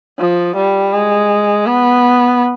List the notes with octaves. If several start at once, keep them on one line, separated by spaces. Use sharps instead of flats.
F3
G3
G#3
B3